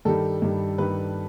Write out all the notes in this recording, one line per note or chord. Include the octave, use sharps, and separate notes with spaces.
G2 D#3 G3 A4
G2 D#3 G3
G2 D#3 G3 B4